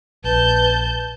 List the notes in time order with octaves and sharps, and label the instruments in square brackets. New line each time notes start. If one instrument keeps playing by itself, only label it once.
[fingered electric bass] A#1 [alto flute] B4 [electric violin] A5 G6